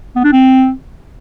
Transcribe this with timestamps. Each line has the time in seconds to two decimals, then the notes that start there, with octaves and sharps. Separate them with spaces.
0.16 B3
0.24 D4
0.33 C4